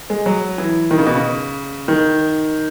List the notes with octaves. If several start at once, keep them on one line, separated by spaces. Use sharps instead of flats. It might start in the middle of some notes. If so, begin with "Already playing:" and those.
G#3
F#3
E3
D#3
C#3
B2
C#3
D#3